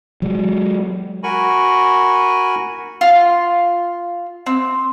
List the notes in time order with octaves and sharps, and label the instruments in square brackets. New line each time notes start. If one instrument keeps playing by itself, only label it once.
[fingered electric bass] F#3 G#3
[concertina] F#4 A#4 G#5 B5 C#6
[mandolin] F4
C4